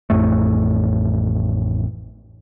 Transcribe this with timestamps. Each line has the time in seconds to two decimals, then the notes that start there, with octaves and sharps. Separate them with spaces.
0.10 A1 F2 A2 A3